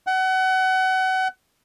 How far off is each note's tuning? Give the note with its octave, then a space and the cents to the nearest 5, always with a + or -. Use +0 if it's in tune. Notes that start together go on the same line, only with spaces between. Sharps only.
F#5 +30